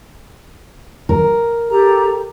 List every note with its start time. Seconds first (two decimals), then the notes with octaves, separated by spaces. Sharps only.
1.09 A#4
1.69 G4 A4 A#5